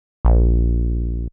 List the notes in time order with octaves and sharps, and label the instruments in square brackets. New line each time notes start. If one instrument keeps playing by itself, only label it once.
[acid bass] A#1